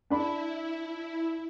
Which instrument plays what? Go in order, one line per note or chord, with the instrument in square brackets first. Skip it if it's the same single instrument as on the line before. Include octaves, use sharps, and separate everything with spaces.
[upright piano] D4 B5 [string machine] E4